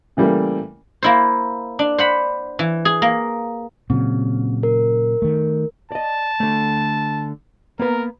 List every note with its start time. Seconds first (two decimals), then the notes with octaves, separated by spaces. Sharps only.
0.17 C#3 E3 G3 A3 A#3
1.03 A#3 E4 C5
1.79 D4
1.98 C5 F#5 B5
2.59 E3
2.85 G#4
3.02 A#3
3.90 A#2 C#3 F#3 C4
4.63 A#4
5.22 D#3 A3
5.92 D5 D#5 A5
6.40 D3 A3
7.79 A#3 B3 A#4 B4